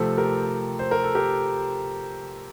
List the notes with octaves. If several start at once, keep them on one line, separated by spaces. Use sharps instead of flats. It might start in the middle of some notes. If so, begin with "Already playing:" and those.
Already playing: C3 F3 A3 C4 A4
G4 A#4
C5
A#4
A4
G4 A#4